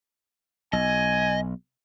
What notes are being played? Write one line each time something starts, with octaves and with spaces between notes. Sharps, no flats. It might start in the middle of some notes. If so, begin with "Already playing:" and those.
B1 D#5 G#5